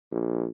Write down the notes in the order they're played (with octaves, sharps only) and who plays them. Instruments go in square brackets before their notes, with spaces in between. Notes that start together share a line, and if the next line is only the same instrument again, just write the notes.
[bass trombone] A#1